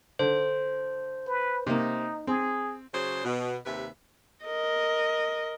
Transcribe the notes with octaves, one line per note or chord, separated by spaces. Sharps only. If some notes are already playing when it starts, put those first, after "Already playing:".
D3 C5
B4
C3 A#3 D#4
C4 G#4
C#3 F#3 G#4 C5
B2
D#2 C3 B4 E5
A#4 D#5